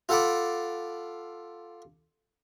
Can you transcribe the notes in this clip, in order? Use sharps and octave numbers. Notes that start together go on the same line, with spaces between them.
F4 A4 F#5 A5 B5 D6